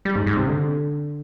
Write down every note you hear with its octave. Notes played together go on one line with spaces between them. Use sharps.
G3
G#2
G#2
C3
D3